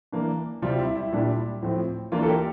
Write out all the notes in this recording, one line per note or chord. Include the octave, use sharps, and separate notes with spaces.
E3 A#3 D4
C3 G3 C4 F4
E4
E4
A#2 G3 D4
A2 F3 C4
E3 A#3 D4 F4
A4
G4 A#4